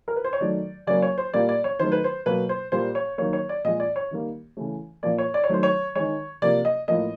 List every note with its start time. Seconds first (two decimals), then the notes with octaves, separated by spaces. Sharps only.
0.08 A#4
0.16 B4
0.24 C5
0.33 C#5
0.41 D#3 F#3 A3 D5
0.87 C#3 F#3 A#3 D5
1.02 C#5
1.18 C5
1.34 A#2 G3 A#3 D5
1.49 D5
1.64 C#5
1.79 D#3 F#3 A3 C5
1.92 B4
2.04 C5
2.26 B2 F#3 A#3 B4
2.49 C5
2.72 A#2 G3 A#3 C5
2.95 C#5
3.18 D#3 F#3 A#3 C#5
3.33 C#5
3.49 D5
3.64 A#2 F3 G#3 D#5
3.80 D5
3.96 C#5
4.11 D#3 G3 A#3
4.57 C#3 E3 A3
5.03 A#2 F3 A#3 D5
5.18 C#5
5.34 D5
5.44 C#5
5.49 D#3 F#3 A3 C5
5.63 C#5
5.95 D#3 G#3 C#5
6.42 C3 F3 A#3 D5
6.65 D#5
6.88 A2 F3 A#3 D#5